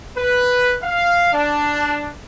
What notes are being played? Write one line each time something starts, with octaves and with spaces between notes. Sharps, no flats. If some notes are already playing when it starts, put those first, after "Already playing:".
B4
F5
D4